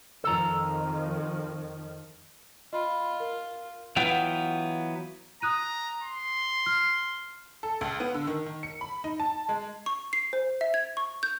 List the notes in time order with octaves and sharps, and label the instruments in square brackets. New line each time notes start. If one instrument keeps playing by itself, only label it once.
[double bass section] F2 D#3 F3 [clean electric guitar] A4 A#5
[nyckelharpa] F4 [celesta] D#5 B5
[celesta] A#4
[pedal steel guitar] E3 F#3 B3 F4 G5
[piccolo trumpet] A#5 [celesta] D#6 F#6 D#7
[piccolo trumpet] C6
[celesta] F6
[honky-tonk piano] A4
C#2
B3
D3
D#3
D#3
C#7
B5
D#4
A5
G#3
[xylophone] C#6
C7
C5
E5
G#6
C#6
G6